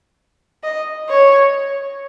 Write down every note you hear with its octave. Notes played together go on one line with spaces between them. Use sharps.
D#5
C#5